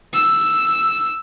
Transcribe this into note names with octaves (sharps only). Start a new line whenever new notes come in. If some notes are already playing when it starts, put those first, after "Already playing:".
E6